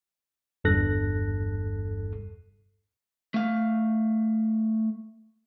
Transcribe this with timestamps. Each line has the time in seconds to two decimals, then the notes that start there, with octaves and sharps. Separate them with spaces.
0.64 G1 E2 G2 A4 F#6 A#6
3.34 A3 F5